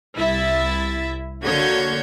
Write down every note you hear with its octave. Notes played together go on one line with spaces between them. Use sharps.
C2 E4 E5 A6
D3 A#3 F#4 C#5 G6 G#6